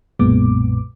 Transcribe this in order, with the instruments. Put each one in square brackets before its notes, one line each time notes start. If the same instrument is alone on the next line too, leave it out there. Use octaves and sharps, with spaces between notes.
[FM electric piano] B1 F#2 A#2 G#3 B3 D6